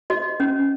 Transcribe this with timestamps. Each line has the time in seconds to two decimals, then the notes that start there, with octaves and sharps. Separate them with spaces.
0.10 F#4 D#5
0.40 C#4